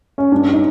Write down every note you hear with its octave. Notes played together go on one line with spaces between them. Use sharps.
C#4
G2 D4
D#4